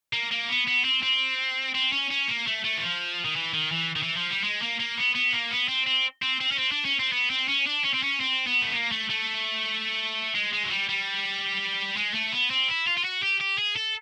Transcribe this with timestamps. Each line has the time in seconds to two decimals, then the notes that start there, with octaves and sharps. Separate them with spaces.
0.13 A#3
0.31 A#3
0.49 B3
0.67 B3
0.84 C4
1.03 C4
1.75 C4
1.92 C#4
2.11 C#4
2.28 A#3
2.47 A3
2.64 A3
2.78 E3
2.82 F3
3.25 D#3
3.36 E3
3.53 D#3
3.72 E3
3.96 D#3
4.03 E3
4.16 F3
4.30 G3
4.43 G#3
4.62 A#3
4.79 A#3
4.98 B3
5.15 B3
5.33 A#3
5.51 B3
5.68 C4
5.87 C4
6.22 C4
6.41 C4
6.52 C#4
6.59 C4
6.72 D4
6.85 C#4
6.99 C4
7.12 B3
7.30 C4
7.48 C#4
7.67 D4
7.84 C#4
7.93 C4
8.02 C#4
8.20 C4
8.47 B3
8.62 A3
8.74 A#3
8.92 A3
9.10 A3
10.35 G#3
10.53 G#3
10.64 F#3
10.71 G3
10.89 G3
11.97 G#3
12.14 A3
12.33 B3
12.50 C4
12.68 E4
12.87 F4
12.97 F4
13.04 F#4
13.22 G4
13.40 G4
13.58 G#4
13.76 A4